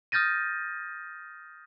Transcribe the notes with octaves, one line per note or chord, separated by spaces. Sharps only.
D#6 F6 G6 A6 A#6 D#7